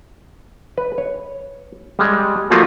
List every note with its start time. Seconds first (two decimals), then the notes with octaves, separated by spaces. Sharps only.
0.78 B4
0.98 C#5
1.99 G3 G#3
2.50 F3 A3 A#3 F4 F#4